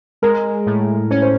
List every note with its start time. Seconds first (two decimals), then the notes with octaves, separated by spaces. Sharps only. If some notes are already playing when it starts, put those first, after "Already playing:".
0.22 G#3 A#4
0.66 A2
1.11 C#4 C#5
1.22 C5